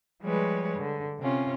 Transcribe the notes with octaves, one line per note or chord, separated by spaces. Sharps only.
F3 G3 G#3 B4 C#5
D3
C3 C#4 F4